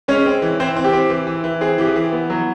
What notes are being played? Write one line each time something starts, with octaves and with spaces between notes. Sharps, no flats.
G#3 C#4 C#5
C4
E3
E3 C4 C5
C4
G4
C4
E3
E3
E3
C4 G#4
E3 G4
G#4
E3
B3
F#3